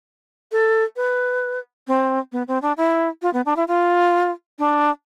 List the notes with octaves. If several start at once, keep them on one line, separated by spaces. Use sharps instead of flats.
A4
B4
C4
B3
C4
D4
E4
F4
B3
D4
E4
F4
D4